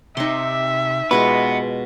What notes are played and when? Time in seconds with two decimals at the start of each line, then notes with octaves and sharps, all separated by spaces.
0.17 C3 D#4 E5 C6
1.11 B2 G#3 B3 F4 B4